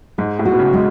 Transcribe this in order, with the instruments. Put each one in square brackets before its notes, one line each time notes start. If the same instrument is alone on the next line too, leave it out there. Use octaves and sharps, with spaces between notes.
[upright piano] G#2 [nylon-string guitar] G#3
[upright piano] A2
[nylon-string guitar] F#4
[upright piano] B2
C#3
[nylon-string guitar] G#3